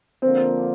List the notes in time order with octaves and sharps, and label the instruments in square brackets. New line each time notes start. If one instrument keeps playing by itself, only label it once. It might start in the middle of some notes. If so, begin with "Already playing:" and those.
[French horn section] D3 F3 A#3 [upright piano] C4